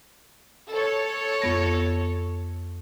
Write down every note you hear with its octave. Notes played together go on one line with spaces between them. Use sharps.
A4 C#5
F2 B3 A#6